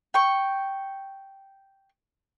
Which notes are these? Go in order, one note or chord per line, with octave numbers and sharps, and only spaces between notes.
G5 C#6